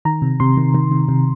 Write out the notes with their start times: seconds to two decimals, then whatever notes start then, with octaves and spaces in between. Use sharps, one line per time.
0.05 D#3 A#5
0.22 C3
0.40 C3 C6
0.57 D#3
0.74 D#3
0.92 C3
1.09 C3